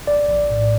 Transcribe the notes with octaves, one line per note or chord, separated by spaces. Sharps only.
A#1 D5
A#1
A2